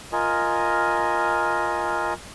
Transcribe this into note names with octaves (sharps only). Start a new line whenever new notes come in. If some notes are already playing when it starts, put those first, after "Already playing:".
F4 A#4 D#5 G#5